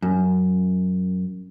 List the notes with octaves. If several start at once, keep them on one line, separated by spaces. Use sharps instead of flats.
F#2